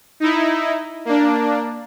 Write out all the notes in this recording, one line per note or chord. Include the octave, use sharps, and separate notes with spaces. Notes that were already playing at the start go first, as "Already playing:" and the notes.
D#4 E4
A#3 D4